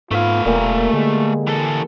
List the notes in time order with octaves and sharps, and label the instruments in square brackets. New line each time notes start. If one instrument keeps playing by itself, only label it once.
[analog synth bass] G#2 [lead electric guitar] A3 F5 [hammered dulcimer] B3 [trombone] F4
[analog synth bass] E1 [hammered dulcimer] A#2 G4 G#5 [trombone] A#3
[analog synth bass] D3 [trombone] G#3
[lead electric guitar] E3 A4